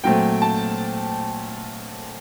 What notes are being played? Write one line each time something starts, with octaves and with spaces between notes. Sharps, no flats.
A#2 F#3 A3 C4 G5
A5